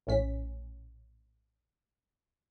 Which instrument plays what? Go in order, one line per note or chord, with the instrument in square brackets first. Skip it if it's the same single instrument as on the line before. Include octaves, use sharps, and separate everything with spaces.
[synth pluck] A#1 A2 C#4 B6